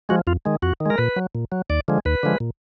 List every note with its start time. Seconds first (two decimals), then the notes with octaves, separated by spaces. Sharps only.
0.09 F3 G#3 F#4
0.27 F2 F4
0.45 D#3 G#3
0.62 F2 F#4
0.80 D#3
0.86 G#3 A#4
0.98 A#2 B4
1.16 F#3
1.35 A#2
1.52 F#3
1.70 D#2 D5
1.88 D3 F3 G#3
2.05 D#2 B4
2.23 D3 F3 G#3
2.40 A#2